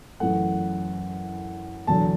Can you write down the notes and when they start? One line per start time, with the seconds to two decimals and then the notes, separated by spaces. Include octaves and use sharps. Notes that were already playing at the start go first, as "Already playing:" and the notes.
0.20 F#2 E3 A3 F#5
1.87 E1 E2 D3 F#3 A5